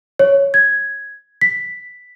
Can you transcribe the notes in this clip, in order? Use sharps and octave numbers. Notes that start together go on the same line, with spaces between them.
C#5
G#6
B6